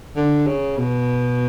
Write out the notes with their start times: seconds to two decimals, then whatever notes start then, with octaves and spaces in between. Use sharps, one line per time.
0.16 D3
0.47 C#3
0.78 B2